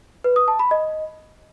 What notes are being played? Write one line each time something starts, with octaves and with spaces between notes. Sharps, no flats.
B4
D#6
A5
B5
D#5